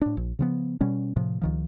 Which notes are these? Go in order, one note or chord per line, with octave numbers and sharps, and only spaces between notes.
A2 D4
A#1
C#3 F3 B3
B2 G3 C#4
A2 C3 F3
C#2 D#3 F3